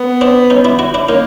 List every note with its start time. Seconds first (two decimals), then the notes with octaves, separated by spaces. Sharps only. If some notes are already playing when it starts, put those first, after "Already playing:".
Already playing: B3
0.21 C4 D4
0.50 C#4 D#4
0.65 D4 E4
0.79 E4 F#4
0.94 D4 E4
1.08 A#3 C#4 D#4